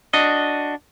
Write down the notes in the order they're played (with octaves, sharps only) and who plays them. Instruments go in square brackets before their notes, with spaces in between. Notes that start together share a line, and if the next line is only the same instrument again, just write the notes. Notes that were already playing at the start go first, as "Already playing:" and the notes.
[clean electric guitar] D4 F#4 D#5